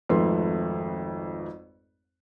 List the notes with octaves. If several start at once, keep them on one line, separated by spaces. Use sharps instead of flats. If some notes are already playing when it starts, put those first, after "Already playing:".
G#1 F2 G#2 A3 B4 C6